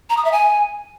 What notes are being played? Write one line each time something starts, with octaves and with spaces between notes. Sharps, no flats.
A#5
D#6
E5
G#5